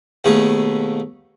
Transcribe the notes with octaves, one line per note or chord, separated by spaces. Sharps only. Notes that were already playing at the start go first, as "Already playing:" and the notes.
D#2 B2 A3 G#4 A4